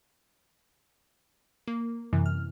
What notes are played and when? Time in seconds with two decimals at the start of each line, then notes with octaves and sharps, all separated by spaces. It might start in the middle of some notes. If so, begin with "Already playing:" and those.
1.68 A#3
2.13 F#2 C3 E3
2.26 F6